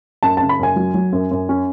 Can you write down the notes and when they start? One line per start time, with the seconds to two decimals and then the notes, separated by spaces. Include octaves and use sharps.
0.23 F#2 A5
0.37 C#3 A5
0.49 B5
0.59 F#2 G#5
0.76 F#3
0.94 F#3
1.13 F#2
1.31 F#2
1.49 C#4